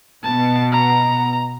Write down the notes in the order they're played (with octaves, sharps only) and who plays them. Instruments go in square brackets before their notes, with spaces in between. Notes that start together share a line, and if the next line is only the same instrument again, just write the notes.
[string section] B2 [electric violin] A5
[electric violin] A#5